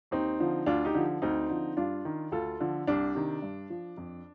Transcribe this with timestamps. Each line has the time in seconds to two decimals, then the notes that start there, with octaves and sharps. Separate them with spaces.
0.11 D#2 C4 D#4
0.40 D3 F3
0.66 D2 D4 F4
0.85 D#4 G4
0.94 D3 F3
1.22 D2 C4 D#4
1.49 D3 F3
1.77 G2 D4 F4
2.05 D#3
2.32 D2 F4 A4
2.60 D3 F3
2.87 C2 D4
3.15 C3 D#3
3.42 G2
3.70 F3
3.97 F2